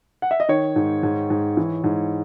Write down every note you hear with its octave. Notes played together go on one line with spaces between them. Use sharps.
F#5
E5
D#5
D#3 C#5
G#2
G#2
G#2
E3
G#2